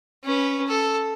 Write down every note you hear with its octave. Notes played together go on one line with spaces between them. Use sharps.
C#4 B4
A4